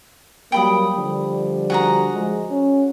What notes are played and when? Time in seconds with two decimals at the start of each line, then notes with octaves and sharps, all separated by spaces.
0.52 F#3 G3 A#3 G5 B5 D#6
0.95 D3 F3 G3
1.70 F#4 G#4 A#5
2.15 F3 G#3
2.50 C#4